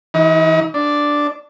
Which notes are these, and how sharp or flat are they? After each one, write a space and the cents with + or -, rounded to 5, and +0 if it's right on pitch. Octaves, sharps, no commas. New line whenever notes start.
E3 -10 D#4 +40
D4 +0 D5 +0